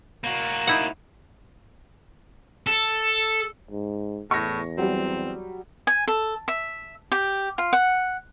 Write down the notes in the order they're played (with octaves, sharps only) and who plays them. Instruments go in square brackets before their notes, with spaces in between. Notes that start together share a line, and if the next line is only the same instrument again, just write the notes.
[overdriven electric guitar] A#3 F#4
[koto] D#4 E4 F#5
[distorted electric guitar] A4
[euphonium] G#2
[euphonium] E2 [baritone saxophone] A2 [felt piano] C#6 A#6
[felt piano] F#3 G3 [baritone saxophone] C4
[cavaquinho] G#5
A4
E5
G4
F4
F#5